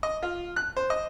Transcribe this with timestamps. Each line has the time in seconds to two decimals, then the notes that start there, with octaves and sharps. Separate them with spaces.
0.03 D#5
0.23 F4
0.56 F#6
0.77 C5
0.90 D#5